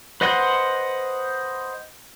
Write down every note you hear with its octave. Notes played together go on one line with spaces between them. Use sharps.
B4 C5 D#5 F#5 C6